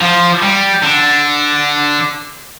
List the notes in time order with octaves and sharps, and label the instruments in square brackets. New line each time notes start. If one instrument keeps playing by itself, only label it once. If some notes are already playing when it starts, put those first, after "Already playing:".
[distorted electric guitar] F3
G3
D3